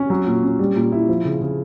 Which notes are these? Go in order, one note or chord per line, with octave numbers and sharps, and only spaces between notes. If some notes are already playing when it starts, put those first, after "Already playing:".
Already playing: C#4
F#3
A#2
C#4
G3
A#2
E4
F3
C#3
C#3